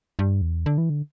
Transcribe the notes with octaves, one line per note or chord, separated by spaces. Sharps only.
G2
E2
D3
E3
D3